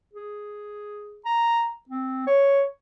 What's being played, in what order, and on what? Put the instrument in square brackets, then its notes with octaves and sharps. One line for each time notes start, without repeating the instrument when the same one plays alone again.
[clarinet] G#4
A#5
C4
C#5